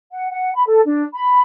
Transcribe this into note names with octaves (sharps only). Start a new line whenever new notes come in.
F#5
F#5
B5
A4
D4
B5